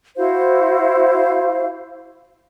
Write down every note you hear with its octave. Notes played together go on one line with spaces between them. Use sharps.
E4 F#4 C5 F5